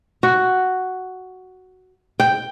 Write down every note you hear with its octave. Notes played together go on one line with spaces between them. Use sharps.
F#4
G5